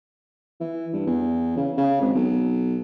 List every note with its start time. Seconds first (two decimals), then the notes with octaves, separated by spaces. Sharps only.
0.61 E3
0.93 G2
1.07 E2
1.57 C#3
1.78 C#3
2.01 G#1
2.14 B1